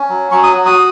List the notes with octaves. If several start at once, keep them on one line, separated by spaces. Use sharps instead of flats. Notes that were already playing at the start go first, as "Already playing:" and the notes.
Already playing: C#4
F#3
F#3 C#6
D#6
F#4
D#6